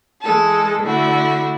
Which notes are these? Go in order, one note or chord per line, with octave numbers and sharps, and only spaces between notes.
E3 G#3 A4
D3 A3 E4 F#4